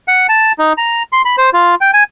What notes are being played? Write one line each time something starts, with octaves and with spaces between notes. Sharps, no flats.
F#5
A5
D#4
A#5
C6
B5
C5
F4
G5
G#5